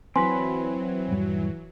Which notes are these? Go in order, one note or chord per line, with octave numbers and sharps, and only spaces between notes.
E3 F#3 C4 B4 G#5 B5 C6
D#1 G2 G3